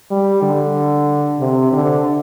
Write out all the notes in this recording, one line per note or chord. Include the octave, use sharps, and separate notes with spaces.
G3
D3
C3
D3